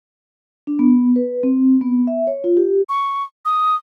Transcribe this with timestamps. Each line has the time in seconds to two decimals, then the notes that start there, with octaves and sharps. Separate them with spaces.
0.67 D4
0.79 B3
1.16 B4
1.43 C4
1.81 B3
2.07 E5
2.27 C#5
2.44 F4
2.57 G4
2.89 C#6
3.45 D#6